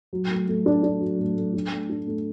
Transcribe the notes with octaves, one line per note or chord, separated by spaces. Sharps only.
F#3
A3
A3
D4
D4
F#3
A3
A3
D4
A3
D4
A3